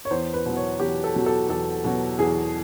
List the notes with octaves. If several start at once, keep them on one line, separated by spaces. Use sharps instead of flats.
C#5
E2 C5
B4
B2 F#3
C#5
E2 G4
A4
B2 F#3
A4
E2 A4
B2 F#3
E2 G#4